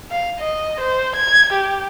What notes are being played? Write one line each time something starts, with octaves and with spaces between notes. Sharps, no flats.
F5
D#5
C5
G#6
G4